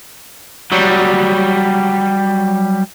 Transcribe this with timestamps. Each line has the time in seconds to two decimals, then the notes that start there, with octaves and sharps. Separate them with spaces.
0.72 F#3 G3